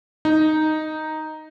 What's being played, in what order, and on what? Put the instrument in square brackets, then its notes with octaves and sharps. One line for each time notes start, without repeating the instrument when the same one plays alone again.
[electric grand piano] D#4